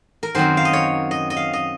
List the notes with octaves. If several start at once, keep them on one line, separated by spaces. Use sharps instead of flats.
A#4
F#2 D#3 F#3 C4 C5
F5
D#5
C#5
D#5
D#5
F5
D#5